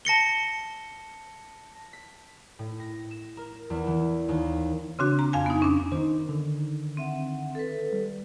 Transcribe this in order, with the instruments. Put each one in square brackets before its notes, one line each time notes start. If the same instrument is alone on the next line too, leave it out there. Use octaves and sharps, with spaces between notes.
[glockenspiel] A5 A#6 C#7 G7
[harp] B6
A2
A#6
E7
A#4
E2
E3
D#2
[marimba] C#3 C4 D4 F#4
A#5
F2 F5 G#5
B3 D#4
C#4 D4
[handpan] D#3 [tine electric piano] D#4 C5
[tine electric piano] D3
[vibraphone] C4 E5 F#5
A4 B4
[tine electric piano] G3